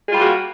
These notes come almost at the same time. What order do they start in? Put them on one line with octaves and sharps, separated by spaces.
G#4 F4 G3 F#4 A#3